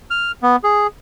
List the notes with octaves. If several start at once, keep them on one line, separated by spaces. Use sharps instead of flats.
F6
B3
G#4